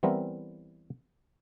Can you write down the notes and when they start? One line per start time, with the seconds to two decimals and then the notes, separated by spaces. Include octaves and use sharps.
0.03 E3 G3 B3 C4 E4 A#4